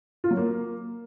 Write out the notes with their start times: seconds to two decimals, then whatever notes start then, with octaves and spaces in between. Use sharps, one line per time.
0.24 F4
0.31 F#3
0.37 A#3